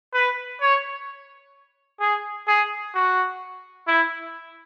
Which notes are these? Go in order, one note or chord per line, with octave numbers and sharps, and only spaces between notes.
B4
C#5
G#4
G#4
F#4
E4